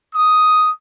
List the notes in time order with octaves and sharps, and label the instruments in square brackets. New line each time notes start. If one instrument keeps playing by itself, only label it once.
[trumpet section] D#6